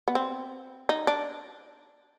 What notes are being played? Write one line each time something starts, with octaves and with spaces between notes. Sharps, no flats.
B3
C4
D#4
D4